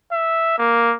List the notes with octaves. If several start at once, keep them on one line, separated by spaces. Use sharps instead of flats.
E5
A#3